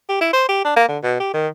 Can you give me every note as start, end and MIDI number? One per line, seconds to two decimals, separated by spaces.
0.09 0.16 67
0.21 0.32 64
0.33 0.44 72
0.49 0.62 67
0.64 0.76 62
0.76 0.87 58
0.88 0.98 50
1.03 1.18 47
1.20 1.30 67
1.34 1.48 51